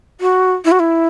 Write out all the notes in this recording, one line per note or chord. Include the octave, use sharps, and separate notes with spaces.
F#4
E4
F#4
E4